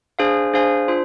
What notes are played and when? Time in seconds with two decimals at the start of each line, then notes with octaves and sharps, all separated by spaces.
0.19 D4 G#4 C5 F5 G#5
0.54 D4 G#4 C5 F5 G#5
0.88 D4 F4 C5